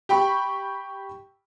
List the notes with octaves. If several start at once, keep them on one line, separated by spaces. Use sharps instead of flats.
G4 G5 B5 C#6